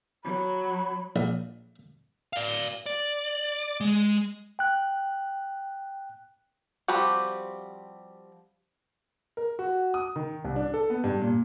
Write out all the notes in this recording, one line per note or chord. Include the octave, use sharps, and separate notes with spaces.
F#3 B5
A#1
D5 F5
D5
G#3
G5 F#6
F3 G3 C4 F#4 G4
A#4
F#4
D#6
D#3
C2
D4
A4
B3
G2
A#2